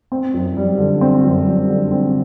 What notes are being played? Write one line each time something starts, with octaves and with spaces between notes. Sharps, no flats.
C4
F#2
G3
D3
C4
F#2
G3
D3
C4